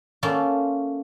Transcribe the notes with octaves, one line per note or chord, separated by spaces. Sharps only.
A3 A#3 C#4 F4